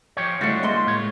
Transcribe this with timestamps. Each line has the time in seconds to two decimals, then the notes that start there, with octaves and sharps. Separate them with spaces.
0.17 F3 G4 C#5
0.41 C#2 A2 G3 D4 F#4
0.63 G#3 A#3 C6
0.87 A2 C#5